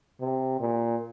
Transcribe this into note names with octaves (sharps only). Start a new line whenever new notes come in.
C3
A#2